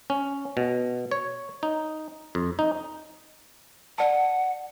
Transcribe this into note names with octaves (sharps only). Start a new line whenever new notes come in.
C#4
B2
C#5
D#4
F2
D#4
D5 F#5 A5